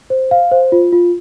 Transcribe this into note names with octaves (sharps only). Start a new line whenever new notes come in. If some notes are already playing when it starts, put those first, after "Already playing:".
C5
F5
C5
F4
F4